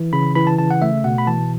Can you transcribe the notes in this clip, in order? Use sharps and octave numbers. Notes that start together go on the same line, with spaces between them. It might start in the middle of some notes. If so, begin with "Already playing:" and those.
Already playing: E3
C#3 B5
E3 B5
A5
C#3 A5
F#5
A3 E5
B2 F#5
B5
E3 A5